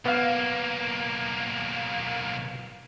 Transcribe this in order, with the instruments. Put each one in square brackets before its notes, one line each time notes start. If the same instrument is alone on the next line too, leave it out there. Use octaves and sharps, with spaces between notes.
[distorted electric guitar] B1 A#3 [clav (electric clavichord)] B3 F5